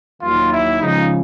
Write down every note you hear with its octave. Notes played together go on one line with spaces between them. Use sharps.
D#2 D#3 F#3 F4
E4
C#2 C#3 F3 D#4